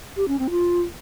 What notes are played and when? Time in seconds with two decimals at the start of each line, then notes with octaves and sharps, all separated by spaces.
0.17 G4
0.28 C#4
0.39 C4
0.50 F4